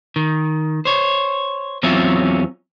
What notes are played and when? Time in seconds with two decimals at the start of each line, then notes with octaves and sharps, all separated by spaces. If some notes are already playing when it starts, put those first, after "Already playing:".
0.16 D#3
0.85 C5 C#5
1.83 E2 F#3 C4 C#4 F4 E5